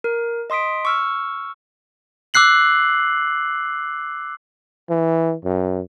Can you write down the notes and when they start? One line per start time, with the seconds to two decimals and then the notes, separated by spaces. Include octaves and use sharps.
0.04 A#4
0.50 D#5 C6 D#6 B6 D7
0.85 C#6 E6 F6
2.34 D6 E6 F#6 C7 F#7
4.90 E3
5.45 F#2